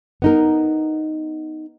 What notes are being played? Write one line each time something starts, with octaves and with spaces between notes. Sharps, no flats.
B3 D#4 A#4